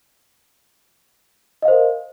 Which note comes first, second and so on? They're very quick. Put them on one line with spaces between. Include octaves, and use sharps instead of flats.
D#5 F5 C5 A#4